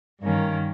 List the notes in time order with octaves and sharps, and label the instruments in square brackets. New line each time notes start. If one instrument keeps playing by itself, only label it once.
[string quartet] G2 D#3 G3 A#3 C#4